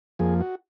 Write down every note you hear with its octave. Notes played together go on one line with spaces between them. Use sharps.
F2 F3 A#3 G#4
F#4